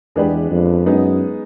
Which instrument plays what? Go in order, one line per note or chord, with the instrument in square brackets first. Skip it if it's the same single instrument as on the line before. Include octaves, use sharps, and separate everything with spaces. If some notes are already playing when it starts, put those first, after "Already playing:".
[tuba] E2 [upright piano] G#3 B3 D4 G4 B4
[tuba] F2
[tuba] F#2 [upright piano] G#3 B3 D#4